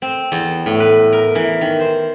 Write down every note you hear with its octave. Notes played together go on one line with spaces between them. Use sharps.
C4
E2
A2
B4
A#4
E3
D#3
C5